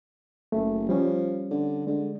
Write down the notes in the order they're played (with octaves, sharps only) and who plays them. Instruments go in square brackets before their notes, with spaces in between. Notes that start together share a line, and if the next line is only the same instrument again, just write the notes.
[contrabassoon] F#1 [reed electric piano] A3
[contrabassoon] F3 [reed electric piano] G3 C#4
[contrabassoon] D3
[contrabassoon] D3 [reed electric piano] G#3